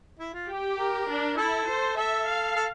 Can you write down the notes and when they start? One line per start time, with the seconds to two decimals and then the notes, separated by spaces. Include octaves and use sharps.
0.19 E4
0.33 F4
0.48 G4
0.78 A#4
1.09 D4
1.37 E4 A4
1.67 C5
1.97 A4 E5
2.26 F5
2.56 A4